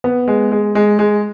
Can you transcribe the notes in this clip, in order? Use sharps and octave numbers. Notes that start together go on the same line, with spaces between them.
B3
G#3
G#3
G#3
G#3